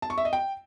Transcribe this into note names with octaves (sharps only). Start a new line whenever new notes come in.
A5
C#6
E5
D#5
G5